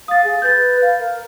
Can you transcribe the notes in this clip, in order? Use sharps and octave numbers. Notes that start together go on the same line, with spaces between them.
F5 D#6 A6
G#4
B4 G6 A6
F5
A#4